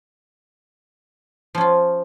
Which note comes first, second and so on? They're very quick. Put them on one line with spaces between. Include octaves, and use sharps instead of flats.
F3 C#4 F4